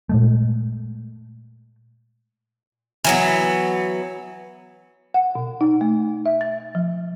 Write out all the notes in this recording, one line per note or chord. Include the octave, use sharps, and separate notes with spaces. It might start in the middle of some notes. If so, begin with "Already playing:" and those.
A#2 G#3 A3
E3 F#3 B3
F#5
B2
D#4
A3
E5
A6
F3